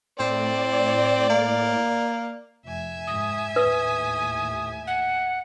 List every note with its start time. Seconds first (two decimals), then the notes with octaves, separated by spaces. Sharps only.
0.20 A2 C4 D5
1.30 A#3
2.66 F1 E5 G#5
3.07 G#2 D#6
3.56 D#2 A2 B4 D#6
4.87 F#5